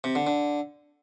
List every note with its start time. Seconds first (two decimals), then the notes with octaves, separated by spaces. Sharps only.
0.04 C3
0.15 D3
0.27 D3